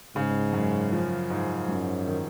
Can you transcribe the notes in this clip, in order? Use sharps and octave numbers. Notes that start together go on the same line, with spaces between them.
G#2 C#3
F#2
F3
G#2
F#2 F#3
D#3